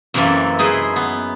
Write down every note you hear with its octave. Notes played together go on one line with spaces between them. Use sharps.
F#2 C3 E3 A#3 C4 A4
D#4 E4 G#4 B4 C5
B3